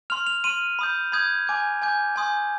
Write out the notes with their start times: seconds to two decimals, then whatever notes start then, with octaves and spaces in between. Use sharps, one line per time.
0.10 C6 F6 F7
0.27 F7
0.44 C6 F6 D#7
0.79 B5 D#6 G6
1.12 B5 D#6 G6 G#6
1.47 G#5 D6 G6
1.82 G#5 D6 G6
2.16 G#5 C6 D#6 G6